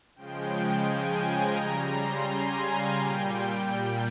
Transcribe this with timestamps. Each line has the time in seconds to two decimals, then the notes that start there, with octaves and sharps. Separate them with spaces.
0.16 C#3 F3 G#3 G5
0.86 G#5
1.21 A#5
1.55 C#3 G3 A#5
1.91 C6
2.26 G#5
2.62 F5
2.96 A#2 G3 G5